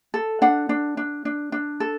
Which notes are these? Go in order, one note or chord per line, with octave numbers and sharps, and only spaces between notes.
A4
D4 F#5
D4
D4
D4
D4
A4